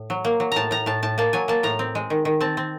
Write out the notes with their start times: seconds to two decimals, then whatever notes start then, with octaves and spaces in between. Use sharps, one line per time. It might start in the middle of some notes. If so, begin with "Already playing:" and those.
Already playing: A2
0.10 F#3
0.25 A#3
0.40 F#3
0.52 A2 A5 A#5
0.71 A2 A#5
0.86 A2 A5
1.03 A2 A5
1.18 A#3 A5
1.33 F#3 G#5
1.48 A#3 A5
1.63 A2 A#5
1.79 C4
1.95 G#3
2.10 D#3
2.25 D#3
2.40 C4 A5
2.57 C4